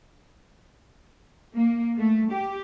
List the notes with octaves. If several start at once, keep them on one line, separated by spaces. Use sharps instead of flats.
A#3
A3
G4